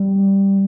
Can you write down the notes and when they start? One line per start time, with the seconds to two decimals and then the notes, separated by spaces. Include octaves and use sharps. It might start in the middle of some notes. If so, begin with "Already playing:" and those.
Already playing: G3